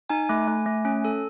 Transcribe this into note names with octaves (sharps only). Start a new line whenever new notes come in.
D#4 G#5
A3
A3
A3
C#4
A4